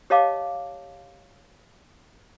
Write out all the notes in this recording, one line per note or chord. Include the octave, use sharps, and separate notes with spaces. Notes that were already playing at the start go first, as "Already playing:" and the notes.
G4 C#5 D#5 F5 A5 D6